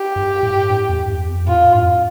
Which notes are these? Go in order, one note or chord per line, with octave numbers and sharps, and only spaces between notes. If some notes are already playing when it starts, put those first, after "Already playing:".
Already playing: G4
G2
A2
G2
E2
E2
F2
A2 F4
G2
F2